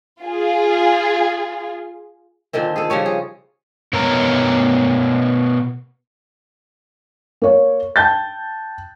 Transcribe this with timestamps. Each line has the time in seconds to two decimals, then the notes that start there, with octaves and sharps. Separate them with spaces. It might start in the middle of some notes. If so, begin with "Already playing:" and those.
0.20 F4 G#4
2.53 A#2 D3 D#3 C4
2.76 G#4 A4
2.90 C#3 F3 G3 C#5
3.06 G#4
3.93 B2 A#4 C#5 A#5
7.42 A#3 C#5
7.96 G5 A5 G6 A6